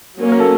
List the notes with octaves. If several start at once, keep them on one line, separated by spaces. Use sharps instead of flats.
F#3 A#3 C#4
A#4
A4